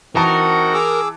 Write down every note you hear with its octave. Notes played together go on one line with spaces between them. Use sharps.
E3 C4 D#4 F#4 A#4 A5
G#4 D6 E6